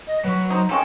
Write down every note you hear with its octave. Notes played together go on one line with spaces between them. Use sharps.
D#5
F#3 B4
D#4 C5
G#3 C#4 F4 A4 G5 A5